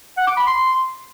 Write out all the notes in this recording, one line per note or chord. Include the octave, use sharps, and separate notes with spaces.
F#5
D6
B5
C6